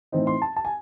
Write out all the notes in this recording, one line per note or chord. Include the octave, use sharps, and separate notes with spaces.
A2 E3 C4 D#4
C6
A5
A5
G#5